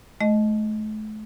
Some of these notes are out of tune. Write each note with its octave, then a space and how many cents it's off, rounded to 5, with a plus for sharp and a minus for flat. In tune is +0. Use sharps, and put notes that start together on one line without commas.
A3 -40 D#5 +0